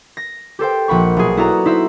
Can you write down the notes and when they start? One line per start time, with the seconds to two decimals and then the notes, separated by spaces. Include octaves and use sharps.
0.17 A#6
0.59 G4 A4 C5 G5
0.88 A#1 F#5 B5 C#6
1.17 B1 G#4
1.37 B3 E4 F#4 A4 D5 A#5
1.65 D#4 E4 C5 E5